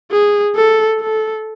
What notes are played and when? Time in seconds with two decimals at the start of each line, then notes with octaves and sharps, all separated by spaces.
0.11 G#4
0.55 A4
1.00 A4